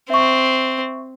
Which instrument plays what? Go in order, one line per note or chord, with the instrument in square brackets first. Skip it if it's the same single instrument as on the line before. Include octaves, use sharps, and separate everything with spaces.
[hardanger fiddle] C4 [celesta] E5 C#6